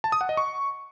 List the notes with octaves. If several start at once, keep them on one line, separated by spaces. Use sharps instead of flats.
A5
D#6
F#5
D#5
C#6